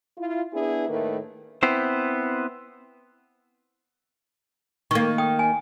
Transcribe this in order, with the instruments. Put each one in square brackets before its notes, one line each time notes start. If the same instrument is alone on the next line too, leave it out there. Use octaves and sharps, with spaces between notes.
[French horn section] E4 F4
B3 D4 E4 G#4
A2 D#3 A3 A#3 B4
[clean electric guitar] B3 C4 E4 C5
[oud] D#3 A#3 [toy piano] C#6
[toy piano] G5 D#6
G#5